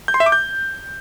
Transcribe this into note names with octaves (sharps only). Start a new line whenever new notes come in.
G6
C6
E5
D6
G6